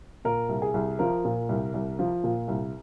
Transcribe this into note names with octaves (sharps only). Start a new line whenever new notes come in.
A#2 A#4
C2
G#4
C2
F3 A#4
A#2
C2
C2
F3
A#2
C2